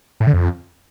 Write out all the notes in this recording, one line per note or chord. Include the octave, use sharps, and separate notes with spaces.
A2
D3
F2